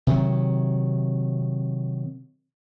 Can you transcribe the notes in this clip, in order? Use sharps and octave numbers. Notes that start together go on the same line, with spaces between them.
C3 D#3 F#3